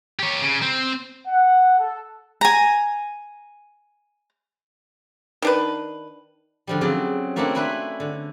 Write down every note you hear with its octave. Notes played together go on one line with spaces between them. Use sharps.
G4 C#5
C#3
C4
F#5
A4
G#5 A#5
D#3 D4 B4
D3 F3 G3
C#3 F#3 C4 D5
A3 A#3 C4 D4 E4 A4
C#4 D4 E4 B4 C5 B5
D3